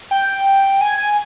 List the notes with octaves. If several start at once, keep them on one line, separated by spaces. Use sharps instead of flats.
G5
G#5
G#5